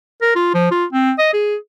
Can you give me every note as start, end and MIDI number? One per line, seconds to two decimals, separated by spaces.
0.22 0.34 70
0.35 0.52 65
0.54 0.70 53
0.71 0.85 65
0.93 1.12 60
1.18 1.28 75
1.33 1.56 68